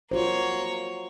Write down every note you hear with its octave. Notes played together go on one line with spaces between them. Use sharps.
A#3 F4 F#4 C5 C#5